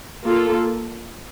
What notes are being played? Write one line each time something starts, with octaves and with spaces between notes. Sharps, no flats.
A#3 F4 A4